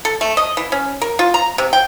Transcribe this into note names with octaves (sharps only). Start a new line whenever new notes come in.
A4
A3
D#5
E3
C#4
A#4
F4
A#5
C3
G5